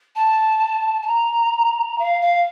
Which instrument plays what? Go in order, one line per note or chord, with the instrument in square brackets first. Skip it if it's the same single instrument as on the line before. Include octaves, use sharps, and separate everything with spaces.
[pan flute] A5
A5
A#5
F5
F5